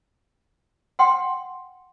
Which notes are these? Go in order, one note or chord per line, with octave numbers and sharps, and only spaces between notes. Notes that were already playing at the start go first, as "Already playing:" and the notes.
F#5 G5 C6